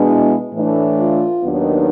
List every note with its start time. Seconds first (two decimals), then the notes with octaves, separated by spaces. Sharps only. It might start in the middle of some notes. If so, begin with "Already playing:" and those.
Already playing: B2 G#3 B3 D4
0.08 E4
0.54 A2 E3 A3 D4
0.98 F4
1.42 D#2 D#3 F#3 B3 D4